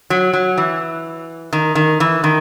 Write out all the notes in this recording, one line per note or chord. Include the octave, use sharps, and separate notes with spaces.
F#3
F#3
E3
D#3
D#3
E3
D#3